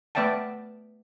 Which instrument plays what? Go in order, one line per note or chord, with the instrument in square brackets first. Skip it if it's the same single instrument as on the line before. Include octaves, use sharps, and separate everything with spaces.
[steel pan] A3 B3 D5 E5 G5 A5